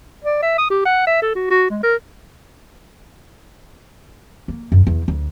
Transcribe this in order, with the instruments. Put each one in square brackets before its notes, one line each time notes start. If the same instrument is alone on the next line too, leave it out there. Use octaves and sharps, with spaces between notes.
[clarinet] D5
E5
D#6
G4
F#5
E5
A4
F#4
F#4
G#3
A#4
[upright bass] A#3
F#2
E2
D2